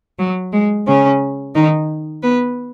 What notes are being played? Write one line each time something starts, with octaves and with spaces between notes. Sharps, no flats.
F#3
G#3
C#3 C#4
D#3 D#4
B3 B4